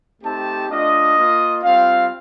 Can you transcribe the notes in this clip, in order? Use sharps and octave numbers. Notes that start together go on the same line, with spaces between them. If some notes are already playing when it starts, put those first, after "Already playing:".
A3 C4 D#4 G4 A5
A3 D4 F4 D#5
A#3 F4
G3 C4 F4 F5